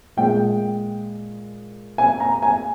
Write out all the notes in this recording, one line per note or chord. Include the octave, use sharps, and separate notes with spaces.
A#2 G#3 G5
G#5
A#5
G#5